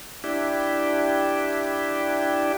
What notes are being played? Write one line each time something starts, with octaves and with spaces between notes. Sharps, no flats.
D4 E4 G4